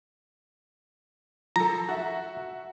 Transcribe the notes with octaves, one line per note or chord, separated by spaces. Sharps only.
F3 A4 A#5
F#4 E5